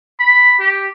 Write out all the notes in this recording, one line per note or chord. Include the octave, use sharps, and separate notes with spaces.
B5
G4